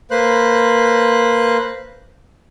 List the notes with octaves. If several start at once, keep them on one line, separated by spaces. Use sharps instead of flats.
A#3 B4 C5 F#6